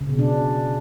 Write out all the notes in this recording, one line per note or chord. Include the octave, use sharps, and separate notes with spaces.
C#3
B2
D4